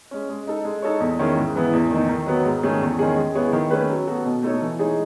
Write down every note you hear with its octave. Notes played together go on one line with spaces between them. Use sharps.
G#3 C#4
G#3
D#4 A4
G#3
D#4 A4 C#5
E2
D#3 G#3 C#4 E4
G#2
E3 B3 E4
E2
D#3 A3 D#4
D#3
F#3 B3
G#2
D#3 A3 C#4 G#4
E2
D#3 G#3 C#4 G#4
G#3
B3 E4 G#4 C#5
D#3
A3 C#4 G#4 B4
F#3
B3 F#4 A4
B2
A3 D#4 A4 C#5
E3
G#3 D#4 G#4 C#5